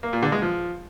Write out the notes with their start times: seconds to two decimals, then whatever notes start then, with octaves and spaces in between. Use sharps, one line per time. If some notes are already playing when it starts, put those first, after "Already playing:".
0.03 A#3
0.13 A#2
0.23 D3
0.32 G#3
0.42 F3